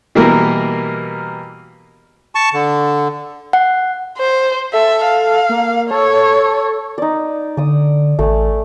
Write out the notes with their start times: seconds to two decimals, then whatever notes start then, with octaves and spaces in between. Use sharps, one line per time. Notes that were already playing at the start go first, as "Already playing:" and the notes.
0.15 B2 E3 G3 A#3 A#4
2.35 A5 C#6
2.54 D3
3.53 F#5
4.18 C5
4.73 A4 E5
5.06 F5
5.49 A#3
5.91 A4 C#5
6.98 D#4 D5
7.57 D3 D5 D#6
8.19 A1 A3 G#5